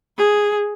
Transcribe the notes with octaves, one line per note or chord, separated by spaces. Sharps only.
G#4